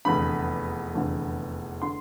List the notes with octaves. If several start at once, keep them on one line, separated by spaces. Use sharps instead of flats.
F1 E2 D3 B5
F1 E2 D3
D3 C6